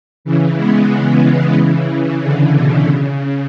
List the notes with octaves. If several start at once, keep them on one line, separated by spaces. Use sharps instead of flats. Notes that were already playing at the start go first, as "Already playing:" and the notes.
C#3 E3
G#3 B3
C#3 E3
D3
B2
C#3